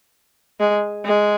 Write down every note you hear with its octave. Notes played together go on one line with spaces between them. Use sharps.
G#3
G#3